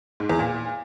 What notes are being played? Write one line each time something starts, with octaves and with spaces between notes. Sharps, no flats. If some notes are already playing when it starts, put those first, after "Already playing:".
G#2
E2
A#2